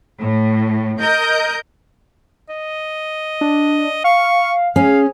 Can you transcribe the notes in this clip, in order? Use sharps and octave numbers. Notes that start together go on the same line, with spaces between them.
A2
A#4 D#5 G6
D#5
D4
F5 C#6
C#4 G#4 F5